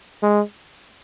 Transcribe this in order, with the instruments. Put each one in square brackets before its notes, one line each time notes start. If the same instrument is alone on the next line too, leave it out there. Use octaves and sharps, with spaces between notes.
[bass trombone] G#3